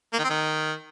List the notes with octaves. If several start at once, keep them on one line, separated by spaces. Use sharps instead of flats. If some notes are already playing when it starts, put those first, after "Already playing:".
A#3
D#3
C4
D#3